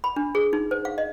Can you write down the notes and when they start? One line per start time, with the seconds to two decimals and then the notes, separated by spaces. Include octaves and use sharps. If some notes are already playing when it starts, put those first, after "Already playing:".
0.04 B5
0.16 D4
0.35 G#4
0.53 D#4
0.71 C5
0.85 F5
0.98 D#5